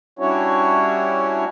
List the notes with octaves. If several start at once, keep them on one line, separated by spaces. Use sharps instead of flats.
G3 C#4 D4 E4 F#4 C#5